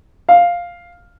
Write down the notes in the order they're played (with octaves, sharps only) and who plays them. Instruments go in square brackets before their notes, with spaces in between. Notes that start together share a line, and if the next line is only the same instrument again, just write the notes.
[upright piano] F5